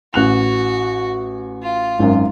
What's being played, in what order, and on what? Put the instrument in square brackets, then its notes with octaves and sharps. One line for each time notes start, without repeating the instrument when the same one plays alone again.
[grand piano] A1 F#6 F7 [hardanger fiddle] F#4
[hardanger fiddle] F4
[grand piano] G#1 F#2